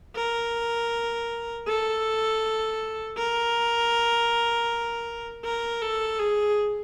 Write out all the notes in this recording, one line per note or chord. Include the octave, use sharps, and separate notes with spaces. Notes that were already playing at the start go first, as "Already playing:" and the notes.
A#4
A4
A#4
A#4
A4
G#4